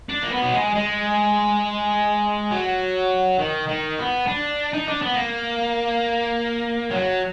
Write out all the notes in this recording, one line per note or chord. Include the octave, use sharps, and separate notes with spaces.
D4
A#3
B3
F#3
G#3
G#3
F#3
D#3
D#3
B3
D4
D#4
D4
B3
A#3
F#3